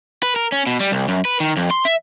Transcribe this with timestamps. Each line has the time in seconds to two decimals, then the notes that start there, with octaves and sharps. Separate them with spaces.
0.23 B4
0.36 A#4
0.52 C#4
0.67 B2
0.80 G3
0.92 C2
1.08 F#2
1.25 B4
1.40 D#3
1.57 F2
1.71 C6
1.85 E5